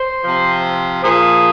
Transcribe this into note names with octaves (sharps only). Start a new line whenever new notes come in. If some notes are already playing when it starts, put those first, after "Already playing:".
Already playing: C5
C3 F3
A#2 F3 G#4